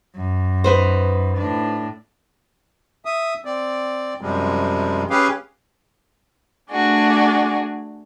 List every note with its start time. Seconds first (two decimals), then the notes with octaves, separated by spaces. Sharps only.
0.16 F#2
0.64 D#4 B4 C5
1.37 A2 D4
3.05 E5 D#6
3.45 C4 D5
4.21 F#2 C3 F3 G3 G#3
5.10 C#4 G4 G#4 B4 F5
6.71 A3 D4 F#4 G#4